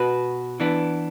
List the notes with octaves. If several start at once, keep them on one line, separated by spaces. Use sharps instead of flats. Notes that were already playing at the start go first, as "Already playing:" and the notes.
Already playing: B2 B3 F#4 B4
E3 B3 D4